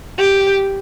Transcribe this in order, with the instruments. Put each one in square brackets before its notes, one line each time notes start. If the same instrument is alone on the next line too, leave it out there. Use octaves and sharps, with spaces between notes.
[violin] G4